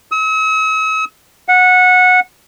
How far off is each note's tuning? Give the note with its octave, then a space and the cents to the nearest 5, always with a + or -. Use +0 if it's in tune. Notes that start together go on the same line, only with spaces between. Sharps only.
E6 -45
F#5 -15